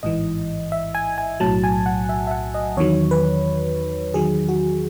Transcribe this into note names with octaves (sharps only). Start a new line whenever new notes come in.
A1 G#2 E3 D#5
E5
G#5
G#5
B1 A2 F#3 A5
G#5
F#5
E5
E5
F#5
D#5
E2 D#3 F#3 C#5
B4
E2 D#3 F#3 G#4
F#4